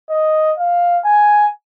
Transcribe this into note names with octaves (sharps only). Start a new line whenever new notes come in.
D#5
F5
G#5